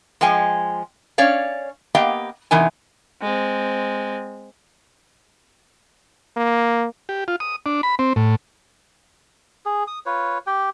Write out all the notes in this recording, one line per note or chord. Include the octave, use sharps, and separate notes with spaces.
F3 G#3 D#5 G5 G#5
C#4 C#5 D5 F5
A#3 B3 G4 D#5 F5 G5
E2 C3 E3 D#4 A#4 G#5
G#3 C4
A#3
G4
F4
D#6
D4
B5
C4
A2
G#4
D#6
F4 B4 C#5
G4 G5